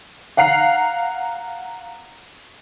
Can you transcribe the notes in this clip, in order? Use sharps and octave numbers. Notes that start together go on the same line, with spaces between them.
F5 F#5 A#5 C7